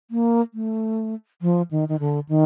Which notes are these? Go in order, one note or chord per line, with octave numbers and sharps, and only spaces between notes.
A#3
A3
F3
D#3
D#3
D3
D#3